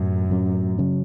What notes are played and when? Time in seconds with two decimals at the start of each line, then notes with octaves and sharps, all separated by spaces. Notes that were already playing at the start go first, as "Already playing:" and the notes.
Already playing: F#2 A2 F#3 C#4
0.29 A2 F#3 C#4
0.78 C#3 F#3 C#4